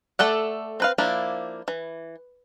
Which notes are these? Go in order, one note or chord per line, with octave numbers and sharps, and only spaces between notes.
A3 A4 D5 F#5
C4 B4 F5
F3 A#3 D4 E4
E3